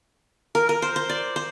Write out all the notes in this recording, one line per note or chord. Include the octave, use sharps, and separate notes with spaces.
A#4
A#4
C5
C5
D5
C5